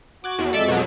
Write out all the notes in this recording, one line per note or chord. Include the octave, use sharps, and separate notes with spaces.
F#4 D6 F#6 G#6
E2
F2 G#3 A4 D5 E5
B2 F#3